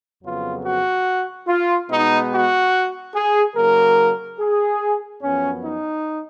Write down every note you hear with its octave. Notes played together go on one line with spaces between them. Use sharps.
F2 C#3 F#3 B3 F4
F#4
F4
B2 G#3 B3 D#4
F#4
G#4
C#3 F#3 A#3 A#4
G#4
F#2 F3 B3 C#4
D#4